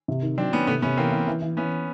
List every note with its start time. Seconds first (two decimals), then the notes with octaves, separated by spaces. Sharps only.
0.08 C3
0.22 D#3
0.38 F#3 C4 D4
0.52 D#3 B3 C#4
0.67 C3 A3 B3
0.82 C3 B3 C#4
0.97 E3 A#3 C4
1.12 E3
1.28 E3
1.42 E3
1.57 E3 B3 C#4